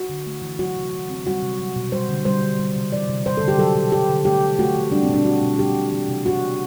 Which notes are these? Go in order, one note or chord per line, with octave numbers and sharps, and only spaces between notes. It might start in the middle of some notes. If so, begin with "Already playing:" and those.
Already playing: F#4
D3
A3
E3
F#3 F#4
C3
E3
C4
G3 F#4
C3
F#3
B2
G3 C5
D3
G3 C5
D3
G3
C3
E3 D5
C3
G3 C5
D3 A4
G4
F#3 A4
B2
F#3 G4
D3
A3 G4
E3
A3 F#4
E3
G3 D4
C4
B2
D4
F#3 F#4
B2
G3 G4
B2
E3
C3
B3 F#4
B3